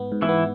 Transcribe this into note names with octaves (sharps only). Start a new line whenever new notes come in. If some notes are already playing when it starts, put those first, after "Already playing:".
Already playing: G#2 B3
G#2
E3 E4
B3